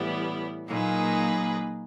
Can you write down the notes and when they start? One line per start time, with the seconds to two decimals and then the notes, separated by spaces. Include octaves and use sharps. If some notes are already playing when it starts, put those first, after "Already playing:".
Already playing: A2 E3 G3 B3 E4
0.67 A#2 F#3 A#3 D#4 G#4 B4